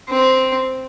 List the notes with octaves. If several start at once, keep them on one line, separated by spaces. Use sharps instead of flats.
C4